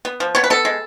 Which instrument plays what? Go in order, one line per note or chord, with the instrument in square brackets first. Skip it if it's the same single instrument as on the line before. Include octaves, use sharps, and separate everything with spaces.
[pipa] B3
F3
B3 C#5
B4
B3 A4
G#3